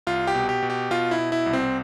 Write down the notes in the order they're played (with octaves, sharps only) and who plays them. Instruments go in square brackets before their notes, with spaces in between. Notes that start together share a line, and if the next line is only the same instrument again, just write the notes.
[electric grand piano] C2 F4
G4
B2
G4
B2
G4
B2 F4
E4
B2
E4
C2
C4